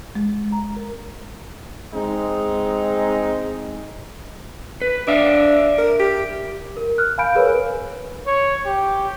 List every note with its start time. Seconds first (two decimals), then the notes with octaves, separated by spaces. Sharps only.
0.15 G#3
0.52 A#5
0.77 A#4
1.94 G#3 C4 D#4
4.82 B4
5.08 D4 D5 E5 F5
5.78 A#4
6.00 G4
6.77 A#4
6.98 F6 F#6
7.18 F5 G#5 B5 G6 D7
7.35 G#4 A#4 B4 C#5
8.27 C#5
8.65 G4